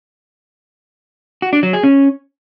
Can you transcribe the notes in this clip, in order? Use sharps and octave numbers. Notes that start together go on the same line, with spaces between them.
F#4
D4
F#3
G#4
C#4